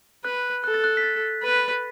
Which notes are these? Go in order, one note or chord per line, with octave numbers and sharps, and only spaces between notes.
B4 F#6
A4 F#6
A6
F#6
B6
A6
B4